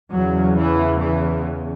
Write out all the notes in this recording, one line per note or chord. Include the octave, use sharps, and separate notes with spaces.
E2 C#3 F#3
E3
E3